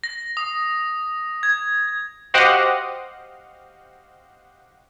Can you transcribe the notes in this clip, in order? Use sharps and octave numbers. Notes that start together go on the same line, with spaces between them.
A#6
D#6
G#6
F#4 G4 C5 D#5 F5 F#5